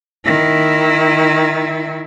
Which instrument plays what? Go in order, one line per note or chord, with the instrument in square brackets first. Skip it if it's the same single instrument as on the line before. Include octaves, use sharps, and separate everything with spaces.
[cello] D#3 E4